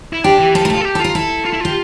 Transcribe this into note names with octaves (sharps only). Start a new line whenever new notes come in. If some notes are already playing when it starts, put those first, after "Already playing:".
E4
D4 G4
E3
F3 A4
A3 A#4
F4 A4
A4
G4
A4
F4 A#4
E4 A4
F4
E4
F4 G4